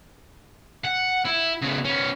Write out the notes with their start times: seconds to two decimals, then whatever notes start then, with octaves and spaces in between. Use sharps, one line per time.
0.85 F#5
1.25 E4
1.62 C#3 B3
1.85 B3 C#4